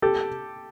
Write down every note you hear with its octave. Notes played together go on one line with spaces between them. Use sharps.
G4 A4